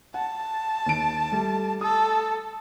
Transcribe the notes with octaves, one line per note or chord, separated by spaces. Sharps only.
F#5 A5
D#2 D7
G3 A3
A4 D#6